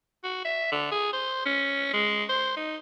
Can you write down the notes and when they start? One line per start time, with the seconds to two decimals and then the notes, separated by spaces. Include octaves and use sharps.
0.24 F#4
0.45 E5
0.72 D3
0.91 G#4
1.13 C5
1.46 C#4
1.93 G#3
2.29 C5
2.56 D#4